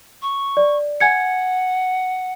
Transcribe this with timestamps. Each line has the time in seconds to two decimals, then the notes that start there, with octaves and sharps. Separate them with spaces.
0.22 C#6
0.57 D5
1.00 F#5 G#5 G#6 C#7